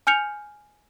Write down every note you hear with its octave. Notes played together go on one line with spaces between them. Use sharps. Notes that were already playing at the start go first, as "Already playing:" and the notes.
G#5 F6 G6 C#7 F7